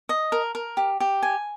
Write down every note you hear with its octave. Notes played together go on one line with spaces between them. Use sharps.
D#5
A#4
A#4
G4
G4
G#5